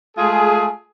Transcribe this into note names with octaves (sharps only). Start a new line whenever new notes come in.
G#3 A3 F4 G#4